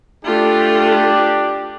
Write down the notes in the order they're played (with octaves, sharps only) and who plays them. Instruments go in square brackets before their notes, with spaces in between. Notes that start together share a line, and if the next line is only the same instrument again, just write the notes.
[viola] A3 F4 [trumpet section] D4 G4